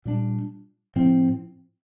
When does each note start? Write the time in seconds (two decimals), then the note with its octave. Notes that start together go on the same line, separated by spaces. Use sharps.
0.05 A#2 G3 D4
0.96 A2 F3 C4